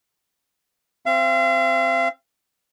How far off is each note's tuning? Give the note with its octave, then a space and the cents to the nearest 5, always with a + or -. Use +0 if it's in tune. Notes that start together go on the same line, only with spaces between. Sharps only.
C4 +0 F5 -40